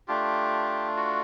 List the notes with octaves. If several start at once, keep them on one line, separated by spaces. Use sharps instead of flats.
A3 D4 F4 G4
F#4